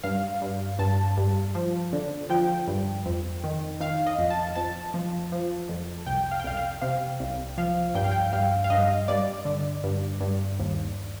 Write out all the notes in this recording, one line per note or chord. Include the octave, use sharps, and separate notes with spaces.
G2 F5
G2
G2 A5
G2
F3
D3
F3 G5
G2
F2
D#3
D#3 F5
D#5
F2
A5
F2 A5
F3
F3
F2
C2 G5
F5
G5
C2 F5
F5
C3 F5
C2
F3 F5
G2 G5
F5
G5
G2 F5
F5
G2 D#5
G2 D5
D3
G2
G2
D#2